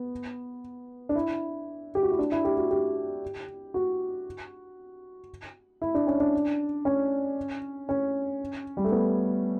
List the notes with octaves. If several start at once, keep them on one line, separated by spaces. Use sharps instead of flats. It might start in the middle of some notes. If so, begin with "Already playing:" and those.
Already playing: B3
D4
E4
G4
F#4
E4
D4
E4
G4
F#4
G4
F#4
E4
D4
C#4
D4
C#4
C#4
G3
A3
B3